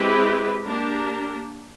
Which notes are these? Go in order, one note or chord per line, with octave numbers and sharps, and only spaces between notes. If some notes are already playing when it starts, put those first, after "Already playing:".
Already playing: G#3 C4 E4 G4 B4
A#3 D4 G4 A#4